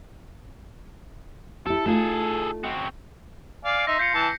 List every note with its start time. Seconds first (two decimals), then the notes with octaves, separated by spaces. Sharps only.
1.66 E4 G4 A4
1.86 A3 D#4 F4 G#4 A4
2.64 C4 F#4
3.65 D5 F5 G#5
3.87 D#4 E5 C6 A#6 B6
3.99 F4 G6 C7 C#7
4.14 E3 A5